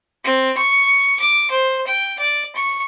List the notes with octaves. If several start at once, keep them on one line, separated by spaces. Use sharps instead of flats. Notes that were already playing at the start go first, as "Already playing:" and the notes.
C4
C#6
D6
C5
G5
D5
C#6